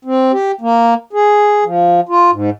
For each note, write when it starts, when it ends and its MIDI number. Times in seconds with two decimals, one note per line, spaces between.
0.05 0.32 60
0.33 0.52 67
0.61 0.94 58
1.13 1.64 68
1.64 2.00 53
2.09 2.31 65
2.32 2.50 44